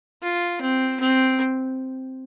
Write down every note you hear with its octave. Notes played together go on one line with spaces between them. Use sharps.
F4
C4
C4